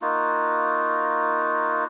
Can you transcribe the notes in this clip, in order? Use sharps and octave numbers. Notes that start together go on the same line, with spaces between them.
A#3 D#4 F4 F#4